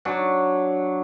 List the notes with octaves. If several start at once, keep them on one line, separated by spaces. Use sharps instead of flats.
F#3 D4